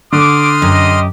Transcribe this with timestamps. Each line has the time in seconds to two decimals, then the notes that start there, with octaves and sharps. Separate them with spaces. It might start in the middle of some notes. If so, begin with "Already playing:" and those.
0.12 D3 C6 D6 D#6 F6
0.62 F#2 G4 D#5